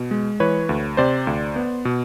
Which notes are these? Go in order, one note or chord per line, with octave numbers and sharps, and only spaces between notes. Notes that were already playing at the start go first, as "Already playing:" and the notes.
Already playing: B2
G#3
E3 B4 C#5
D2
C3 C5 D5
D2
B3
B2